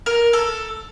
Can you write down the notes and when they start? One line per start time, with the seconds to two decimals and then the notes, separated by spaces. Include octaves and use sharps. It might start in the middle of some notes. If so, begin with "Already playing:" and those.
0.06 A#4
0.33 A4